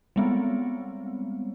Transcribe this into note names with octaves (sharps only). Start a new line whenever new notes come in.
G3 G#3 B3 C4